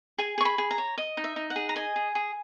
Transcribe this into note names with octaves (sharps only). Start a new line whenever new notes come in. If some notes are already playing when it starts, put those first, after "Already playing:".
G#4 G#5
G#4 C#6
B5
G#4
A#5
C#5
D#5
D#4
E5
D#4
F#5
G#4
A#5
D#5 G#5
G#4
G#4